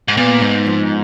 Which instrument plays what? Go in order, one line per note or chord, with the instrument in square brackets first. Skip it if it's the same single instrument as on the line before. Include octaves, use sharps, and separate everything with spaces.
[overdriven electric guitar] G#2
[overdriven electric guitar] A#2 [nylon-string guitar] B3
[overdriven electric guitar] G#2 [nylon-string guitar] D#4
[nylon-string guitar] F3